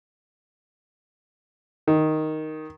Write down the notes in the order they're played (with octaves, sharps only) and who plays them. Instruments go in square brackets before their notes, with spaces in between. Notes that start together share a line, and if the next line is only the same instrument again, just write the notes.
[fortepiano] D#3